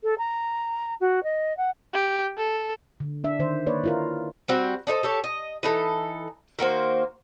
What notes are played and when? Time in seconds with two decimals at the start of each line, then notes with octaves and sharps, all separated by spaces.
0.03 A4
0.18 A#5
1.00 F#4
1.23 D#5
1.57 F#5
1.94 G4
2.37 A4
3.00 D3
3.24 D4 E5
3.39 D#3 C5
3.66 A#3 B4 C#5 D5
3.84 E4 F4 A#4
4.48 G3 C4 F#4
4.87 D4 D#4 A4 C5
5.03 G4 A4 C#5
5.24 D#5
5.63 E3 D#4 A4
6.59 D#3 A#3 F#4 C5